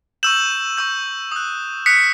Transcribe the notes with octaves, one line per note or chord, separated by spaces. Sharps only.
C#6 E6 G6 E7 F#7
C#6 E6 G6
D#6 F#6
D#6 F#6 B6 C#7